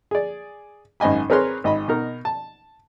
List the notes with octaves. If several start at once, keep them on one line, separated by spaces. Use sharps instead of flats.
G#4 D5
G#1 F#2 D#5 G#5 B5
C4 G#4 A#4 B4 C#5 C6
G#1 D#5 B5
B2 D#4 A#4
A5